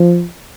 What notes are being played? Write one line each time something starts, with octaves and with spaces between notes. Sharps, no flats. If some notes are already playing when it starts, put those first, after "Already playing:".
Already playing: F3